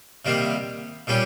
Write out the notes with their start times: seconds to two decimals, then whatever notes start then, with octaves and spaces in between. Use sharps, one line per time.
0.25 C3 D#3 G3 A#3
1.07 A#2 G3 C#4 G4